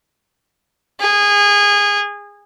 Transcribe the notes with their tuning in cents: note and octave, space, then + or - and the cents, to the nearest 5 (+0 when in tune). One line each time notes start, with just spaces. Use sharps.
G#4 -25